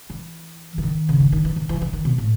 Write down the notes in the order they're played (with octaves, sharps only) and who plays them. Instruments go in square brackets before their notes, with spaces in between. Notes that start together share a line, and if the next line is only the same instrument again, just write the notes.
[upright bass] E3
E3
D#3
C#3
D#3
D#3
E3
D#3
E3
E3
D#3
B2
A2